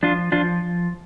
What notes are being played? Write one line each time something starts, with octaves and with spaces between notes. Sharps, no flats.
F3 D4 F4
F3 D4 F4